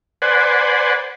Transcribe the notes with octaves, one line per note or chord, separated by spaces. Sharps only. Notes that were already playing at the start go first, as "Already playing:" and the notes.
B4 C5 D5 F#5 G#5